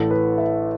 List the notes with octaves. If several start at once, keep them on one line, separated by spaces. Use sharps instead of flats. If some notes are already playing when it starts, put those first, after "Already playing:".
Already playing: A1 A2 E3 A4
B4
E5